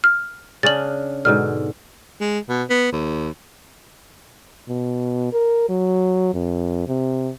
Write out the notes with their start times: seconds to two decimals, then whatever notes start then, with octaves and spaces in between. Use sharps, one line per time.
0.04 F6
0.63 C#3 C#4 D4 A6 F#7
1.25 G#2 B2 D3 F6
2.21 G#3
2.49 B2
2.70 B3
2.92 D#2
4.69 B2
5.33 A#4
5.69 F#3
6.34 F2
6.87 C3